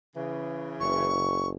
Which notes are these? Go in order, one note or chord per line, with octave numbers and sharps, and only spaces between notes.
C#3 E3
F#1 C#6